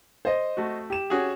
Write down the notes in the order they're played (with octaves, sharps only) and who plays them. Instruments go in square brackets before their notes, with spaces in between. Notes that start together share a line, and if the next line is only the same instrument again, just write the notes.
[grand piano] C5 D#5
[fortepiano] A3 F#4
[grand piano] G4 E7
[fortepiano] C#4 F#4 G#4